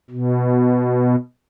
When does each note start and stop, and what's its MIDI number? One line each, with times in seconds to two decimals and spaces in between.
0.10 1.16 47